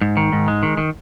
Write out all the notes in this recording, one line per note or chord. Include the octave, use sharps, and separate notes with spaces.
G#2
D#3
G#2
G#3
D#3
D#3